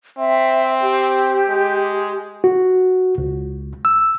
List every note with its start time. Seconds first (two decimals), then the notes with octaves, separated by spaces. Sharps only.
0.18 C4 E5
0.82 G4
1.49 G#3
2.44 F#4
3.18 C#2
3.85 E6